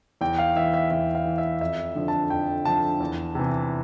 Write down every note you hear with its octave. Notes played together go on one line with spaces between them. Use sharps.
E2 G5
F5
E3 E5
E5
E2 E5
F5
E3
E5
F2 E5
D3 F3
A5
F2 G5
D3 F3 A5
E2
C3 E3